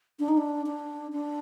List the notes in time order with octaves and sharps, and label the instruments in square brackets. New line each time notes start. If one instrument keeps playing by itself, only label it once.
[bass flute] D4
D#4
D4
D4
D4